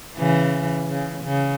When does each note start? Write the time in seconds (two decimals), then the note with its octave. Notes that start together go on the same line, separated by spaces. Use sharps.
0.17 C#3 E3
0.89 C#3
1.24 C#3